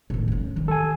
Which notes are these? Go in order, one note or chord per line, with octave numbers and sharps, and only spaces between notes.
A2 D#3
B3 C#4
D#3 E3
A4 G#5